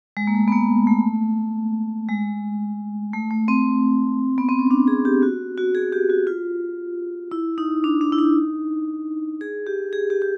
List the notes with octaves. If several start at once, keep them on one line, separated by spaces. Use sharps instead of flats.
G#3
A#3
A3
B3
A#3
A3
G#3
A3
A3
C4
B3
C4
C#4
D4
G#4
G4
F#4
F#4
G#4
G4
F#4
F4
E4
D#4
D4
D4
E4
D#4
G#4
G4
G#4
G4
G4